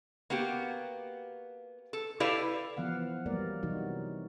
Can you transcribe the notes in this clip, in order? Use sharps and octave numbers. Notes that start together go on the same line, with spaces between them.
A#3 B3 F#4 G4
A4
E4 G4 A4 B4 D5 F5
E3 F3 B3 F5 F#5
F#3 G3 A#3 A#4 D5
C3 E3 F#3 G3 D#4 F#4